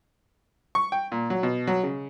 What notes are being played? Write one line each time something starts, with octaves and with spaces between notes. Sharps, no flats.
C#6
G5
A#2
F#3
B2
F#3
C#3